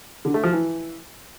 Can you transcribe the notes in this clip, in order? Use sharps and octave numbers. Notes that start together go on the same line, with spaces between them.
D3
A3
F3
E3